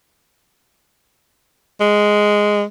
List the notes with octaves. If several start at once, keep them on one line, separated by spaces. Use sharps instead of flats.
G#3